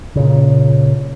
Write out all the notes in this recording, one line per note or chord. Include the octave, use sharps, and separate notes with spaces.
A#2 C#3